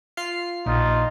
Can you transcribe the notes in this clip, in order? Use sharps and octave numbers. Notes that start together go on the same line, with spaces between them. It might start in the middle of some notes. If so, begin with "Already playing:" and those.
F4 F6 C7
A#1 A#2 D#4 F4